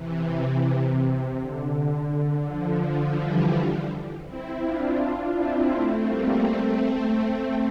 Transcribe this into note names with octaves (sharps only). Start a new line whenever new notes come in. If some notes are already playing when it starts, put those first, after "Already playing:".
Already playing: C3 E3
C3
C3
D3
D3 F3
D3 F3
E3 G3
C4 E4
D4 F4
C4 E4
A3 C4
G3 A#3
A3 C4